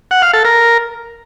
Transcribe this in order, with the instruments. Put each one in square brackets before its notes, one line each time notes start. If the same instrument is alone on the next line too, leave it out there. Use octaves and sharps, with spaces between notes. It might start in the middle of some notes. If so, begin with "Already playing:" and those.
[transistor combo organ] F#5
F5
A4
A#4